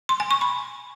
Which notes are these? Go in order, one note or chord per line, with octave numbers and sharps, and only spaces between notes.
C6
G#5
C#6
B5